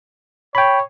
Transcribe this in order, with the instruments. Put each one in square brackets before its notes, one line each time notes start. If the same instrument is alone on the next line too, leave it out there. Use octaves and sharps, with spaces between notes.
[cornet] C#5 [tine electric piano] G5 B5